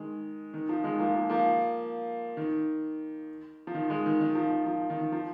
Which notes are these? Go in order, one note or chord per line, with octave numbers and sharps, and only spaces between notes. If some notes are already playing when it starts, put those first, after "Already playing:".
Already playing: D#3 G#3
D#3
F3
D#3 G#3
F3 A#3
F3 A#3
F3 A#3
D#3
F3
D#3
D#3 G#3
D#3
D#3
F3
D#3
F3
D#3
D#3
F3